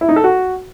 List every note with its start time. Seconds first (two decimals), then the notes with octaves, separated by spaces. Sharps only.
0.01 E4
0.09 D#4
0.16 A4
0.24 F#4